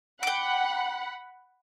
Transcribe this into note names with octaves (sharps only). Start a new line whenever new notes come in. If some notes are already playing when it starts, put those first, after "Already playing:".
F#5 G5 B5 D6